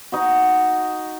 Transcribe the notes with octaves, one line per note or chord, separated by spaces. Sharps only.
D#4 F#4